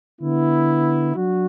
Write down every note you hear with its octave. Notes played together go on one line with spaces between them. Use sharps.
D3 B3 E4
F#3 D4 F#4